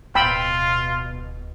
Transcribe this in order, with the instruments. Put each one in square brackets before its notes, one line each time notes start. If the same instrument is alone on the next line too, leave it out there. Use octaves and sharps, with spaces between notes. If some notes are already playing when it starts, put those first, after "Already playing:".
[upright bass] D1 [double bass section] B2 [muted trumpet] F4 [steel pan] G5 B5 E6